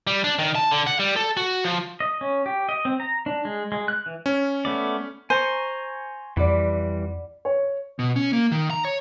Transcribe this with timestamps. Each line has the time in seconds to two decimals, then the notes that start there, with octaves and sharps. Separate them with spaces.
0.07 G3
0.24 D4
0.39 D#3
0.55 A5
0.71 D3
0.87 F#5
1.00 G3
1.16 A4
1.37 F#4
1.64 F3
2.00 D#5
2.21 C#4
2.46 G4
2.69 D#5
2.85 C4
3.00 A#5
3.26 D4
3.45 G#3
3.72 G#3
3.88 F#6
4.06 E3
4.26 C#4
4.65 A3 B3 D5
5.30 C5 G#5 A#5 C#6
6.37 F2 E3 G3 D5 F#5 B5
7.45 C#5
7.99 B2
8.16 C#4
8.33 A#3
8.52 D#3
8.70 A#5
8.85 C#5